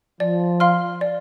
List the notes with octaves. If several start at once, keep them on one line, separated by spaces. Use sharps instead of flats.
F3 D5
F5 C6 F6
D5